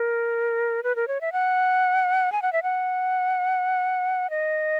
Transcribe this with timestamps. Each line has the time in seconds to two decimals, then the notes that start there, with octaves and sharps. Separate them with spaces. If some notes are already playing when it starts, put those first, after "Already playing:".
Already playing: A#4
0.83 B4
0.96 A#4
1.08 C#5
1.21 E5
1.33 F#5
2.32 G#5
2.42 F#5
2.53 E5
2.63 F#5
4.30 D#5